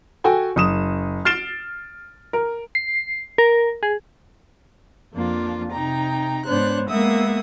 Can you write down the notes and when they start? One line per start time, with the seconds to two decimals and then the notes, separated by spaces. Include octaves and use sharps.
0.24 F#4 A4 G5 G#5
0.56 F#1 D#6 E7
1.25 F6 A6 C7 D7 E7 G7
2.33 A#4
2.75 C7
3.38 A#4
3.83 G#4
5.13 F2 F3 A#3 D4 F4
5.72 C3 D#4 G5 A#5
6.46 G#2 B3 D4 C5 C#5 F#6
6.89 G#3 A#3 B3 E5 F#5 D#6